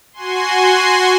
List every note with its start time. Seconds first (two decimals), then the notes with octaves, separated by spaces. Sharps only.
0.13 F#4 G#5 C6